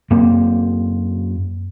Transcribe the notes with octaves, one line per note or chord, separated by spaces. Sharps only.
F#2 A#3 C4